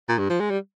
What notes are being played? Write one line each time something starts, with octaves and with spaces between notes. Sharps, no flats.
A#2
G2
F3
G#3
G3